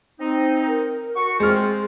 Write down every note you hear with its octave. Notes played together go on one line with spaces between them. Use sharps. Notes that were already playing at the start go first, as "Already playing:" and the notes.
C4 D#4
A#4
F#4 C#6
G#3 C4 F4 G#4 C5 F6